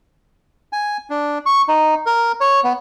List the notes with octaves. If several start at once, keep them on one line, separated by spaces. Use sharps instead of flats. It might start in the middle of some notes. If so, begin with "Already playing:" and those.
G#5
D4
C#6
D#4
A#4
C#5
B3